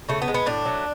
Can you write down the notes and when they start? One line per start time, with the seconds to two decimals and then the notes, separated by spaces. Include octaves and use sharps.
0.09 C#3 A3
0.22 B3
0.28 G#3
0.34 B3
0.46 A2 D4
0.65 F#3 A3